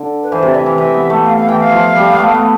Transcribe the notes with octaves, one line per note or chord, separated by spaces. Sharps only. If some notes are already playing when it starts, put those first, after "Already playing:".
Already playing: D3
B4
E3 C5
C3
D5
E3 E5
E3
E3 E5
B3
A3
F5
F5
E3 G5
F5
F3
G3
B3
A3
B3